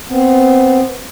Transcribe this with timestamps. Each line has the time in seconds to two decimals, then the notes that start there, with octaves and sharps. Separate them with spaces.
0.09 B3 C4